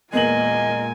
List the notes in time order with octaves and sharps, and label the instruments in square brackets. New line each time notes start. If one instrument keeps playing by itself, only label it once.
[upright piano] E2 A#3 F#7 [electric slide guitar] A#2 G#3 [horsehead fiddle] A#4 G#5 [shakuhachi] D#5